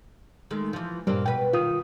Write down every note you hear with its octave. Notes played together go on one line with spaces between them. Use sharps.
D#3 G#3 A3
E3 F3
G2 A#2 G3 A#3 C4 D4
B2 B4 G5
D#3 F4 D#6